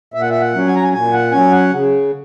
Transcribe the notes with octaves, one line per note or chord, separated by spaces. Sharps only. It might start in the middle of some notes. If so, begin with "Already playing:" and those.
A#2 E5
F#5
E5
F#5
F#3 C#4
G#5
A#5
G#5
A#2 G#5
F#5
F#3 C#4 G#5
F#5
C#3